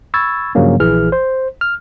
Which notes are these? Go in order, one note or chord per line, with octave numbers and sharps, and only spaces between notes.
B5 C#6 E6 G#6 A6
G2 C#3 F3 F#3 A#3 C#4
A#1 E3 G#4 F6
C5
F6